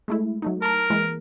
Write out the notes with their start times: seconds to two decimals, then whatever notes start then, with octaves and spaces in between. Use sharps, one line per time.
0.08 G#3 A3 E4
0.42 F#3 A3 D#4
0.62 A#4 A5 A#5
0.90 E3 G#3 A#3